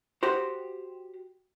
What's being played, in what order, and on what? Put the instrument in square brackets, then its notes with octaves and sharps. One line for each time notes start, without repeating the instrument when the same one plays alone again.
[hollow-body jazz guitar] F#4 G4 C5